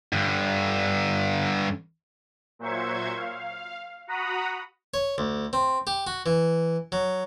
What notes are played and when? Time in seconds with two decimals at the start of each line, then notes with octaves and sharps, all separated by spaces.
0.13 G2 D3
2.59 A#2 F#3 C5 E5 C#6 G#6
3.17 F5
4.07 F#4 F#5 A#5 B5 D#6
4.94 C#5
5.18 D2
5.53 C4
5.87 G4
6.07 F#4
6.26 E3
6.92 F#3